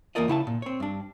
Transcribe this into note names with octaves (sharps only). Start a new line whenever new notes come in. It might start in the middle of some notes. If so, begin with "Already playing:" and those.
E2 A#3 F4 A#4 D5 D#5
C#3 E4 F#5 A5
A#2
C4 C#5
G2 D4